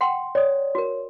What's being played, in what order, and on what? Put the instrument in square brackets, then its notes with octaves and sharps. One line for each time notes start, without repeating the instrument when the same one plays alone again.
[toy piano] F#5 G5 C6
[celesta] C#5 [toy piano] D5 D#6
[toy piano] F#4 A#4